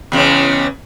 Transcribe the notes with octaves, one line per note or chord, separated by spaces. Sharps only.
E2 C#3 G#3